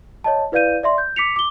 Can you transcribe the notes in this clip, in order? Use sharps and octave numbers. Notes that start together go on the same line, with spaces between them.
C#5 D#5 A5
E4 B4 D5 F5 G6 D#7
D5 E5 C6
G6
D6 B6 C#7 F7
D6 G7